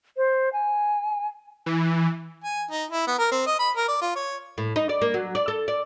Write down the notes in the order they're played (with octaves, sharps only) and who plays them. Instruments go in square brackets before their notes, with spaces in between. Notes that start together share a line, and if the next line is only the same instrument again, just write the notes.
[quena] C5
G#5
[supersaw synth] E3
[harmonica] G#5
D#4
E4
B3
A#4
C4
D#5
B5
A#4
D5
F4
C#5
[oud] A2
D#4
D5
A#3
F#3
D5
A4
D5